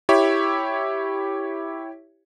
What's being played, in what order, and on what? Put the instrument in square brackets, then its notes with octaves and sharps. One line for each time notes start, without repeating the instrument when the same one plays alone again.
[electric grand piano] E4 G4 C#5 E5